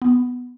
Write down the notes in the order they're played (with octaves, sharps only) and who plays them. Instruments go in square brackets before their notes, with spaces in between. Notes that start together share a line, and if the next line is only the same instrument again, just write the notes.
[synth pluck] B3